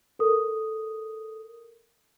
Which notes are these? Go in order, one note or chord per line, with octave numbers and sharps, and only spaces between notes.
A4 A#4 D#6